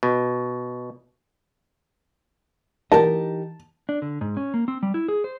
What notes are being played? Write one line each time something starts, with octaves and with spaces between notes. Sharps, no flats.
B2
E3 D#4 G4 A#4 D#5 A5
D4
D3
G#2
C#4
A#3
C4
G3
E4
G#4
C5